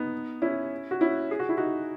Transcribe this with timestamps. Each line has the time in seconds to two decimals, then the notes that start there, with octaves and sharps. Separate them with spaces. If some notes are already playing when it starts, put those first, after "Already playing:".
Already playing: B3 D#4
0.42 C#4 E4
0.91 F#4
1.01 C#4 E4
1.31 G#4
1.39 F#4
1.49 E4
1.57 D#4 F#4